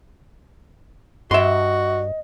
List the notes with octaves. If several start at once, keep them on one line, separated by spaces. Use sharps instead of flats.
G2 F#4 D#5 E5 C6